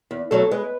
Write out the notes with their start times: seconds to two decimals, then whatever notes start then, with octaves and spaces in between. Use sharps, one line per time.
0.11 E2
0.31 B2 F#3 A3 A4
0.51 G#3 B4